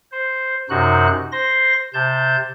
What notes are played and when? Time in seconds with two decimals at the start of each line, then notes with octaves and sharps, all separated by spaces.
0.12 C5
0.70 F#2 C3 D#4 F#4 F#6
1.32 C5 C6 A#6
1.94 C3 A5 G6